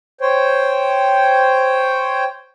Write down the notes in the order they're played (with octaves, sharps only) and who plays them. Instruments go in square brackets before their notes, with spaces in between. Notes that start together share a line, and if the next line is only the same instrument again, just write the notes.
[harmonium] C5 C#5 G5